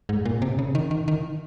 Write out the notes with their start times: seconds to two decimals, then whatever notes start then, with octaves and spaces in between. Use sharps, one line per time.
0.09 G#2
0.25 A#2
0.42 C3
0.59 C#3
0.75 D#3
0.91 D#3
1.08 D#3